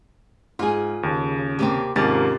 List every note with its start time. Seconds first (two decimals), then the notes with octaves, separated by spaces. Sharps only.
0.59 G#2 F4 G#4
1.03 D#2 C#3
1.59 C3 A#3 C4
1.96 D#2 G#2 C3 C#4 F4 A#4 A6